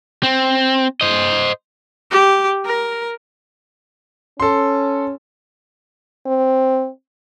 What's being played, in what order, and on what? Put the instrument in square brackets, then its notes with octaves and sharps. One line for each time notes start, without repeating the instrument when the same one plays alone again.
[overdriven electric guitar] C4
C5 D#5
[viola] G4
A#4
[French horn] C#4 [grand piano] A4 C6
[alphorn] C4